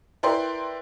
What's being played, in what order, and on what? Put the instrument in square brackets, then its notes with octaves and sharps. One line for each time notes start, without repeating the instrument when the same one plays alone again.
[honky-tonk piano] E4 A#4 B4 D5 G5 C6